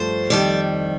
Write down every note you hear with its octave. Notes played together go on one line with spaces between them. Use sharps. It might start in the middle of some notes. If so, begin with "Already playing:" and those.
Already playing: G2 F3 A3 C5
F2 D#3 G3 D5